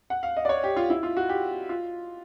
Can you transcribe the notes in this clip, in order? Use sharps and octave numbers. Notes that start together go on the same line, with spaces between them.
F#5
F5
D#5
D5
C#5
G4
F4
E4
F4
F#4
G4
F4